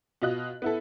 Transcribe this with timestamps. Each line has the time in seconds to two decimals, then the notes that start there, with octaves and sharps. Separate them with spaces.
0.22 B2 F4 D#5 F#6
0.62 B3 E4 A4